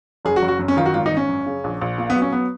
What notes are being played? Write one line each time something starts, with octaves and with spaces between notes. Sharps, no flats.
F#1 G#4
F#4
F#1
F#4
F#2
C#4
D#3 F4
F#4
G#1 F4
D#4
G#1
C#4
F#2
C#3
A#1
A#1
A#2 A#3
B3
F#3
C#4
B3